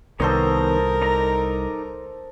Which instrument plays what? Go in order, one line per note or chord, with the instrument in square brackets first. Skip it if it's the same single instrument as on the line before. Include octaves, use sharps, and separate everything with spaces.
[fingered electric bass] C2 [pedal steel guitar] D#3 B3 C#5 [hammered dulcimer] A4 C5 D#5 [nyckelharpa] A#4
[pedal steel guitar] D#4 D5 A#5